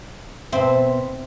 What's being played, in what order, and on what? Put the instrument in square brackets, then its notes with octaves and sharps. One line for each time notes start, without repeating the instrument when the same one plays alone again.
[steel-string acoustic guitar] B2 E5 [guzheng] C4